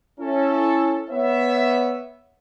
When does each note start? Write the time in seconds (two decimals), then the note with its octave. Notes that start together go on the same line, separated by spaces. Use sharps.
0.19 C#4 E4 A4
1.10 B3 C#5 E5